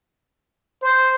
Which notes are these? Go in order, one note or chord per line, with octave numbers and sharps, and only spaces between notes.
C5